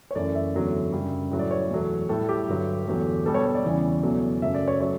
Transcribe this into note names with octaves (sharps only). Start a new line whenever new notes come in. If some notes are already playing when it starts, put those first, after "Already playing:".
C#5
F#2 E3 A3 D5
E5
E2 D3 F#3 A3
F#2 C#3 G3
A2 F#3 A3
D5
C#5
E2 B2 F#3 A3
A2 G3 A4
G4
G2 D3 F#3
E2 D3 F#3 A3
B2 G3 A4
C#5
C#5
D5
E2 C#3 E3 G3
E2 B2 F#3 A3
F#2 C#3 F#3 A3 E5
D5
C#5
F#3 A3 C#5